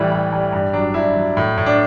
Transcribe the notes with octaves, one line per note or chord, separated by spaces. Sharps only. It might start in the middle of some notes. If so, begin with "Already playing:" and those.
Already playing: A2 E3 G3
G3
G3
G2
F#3 D4
G2 E4
F#3
A2
A2
D4